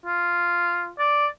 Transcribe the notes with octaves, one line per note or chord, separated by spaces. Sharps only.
F4
D5